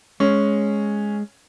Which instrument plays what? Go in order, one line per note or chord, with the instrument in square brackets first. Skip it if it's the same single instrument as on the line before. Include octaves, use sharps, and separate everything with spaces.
[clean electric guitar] G#3 [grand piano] C#4